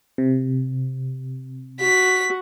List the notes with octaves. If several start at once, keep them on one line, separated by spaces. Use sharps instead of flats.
C3
F#4 B6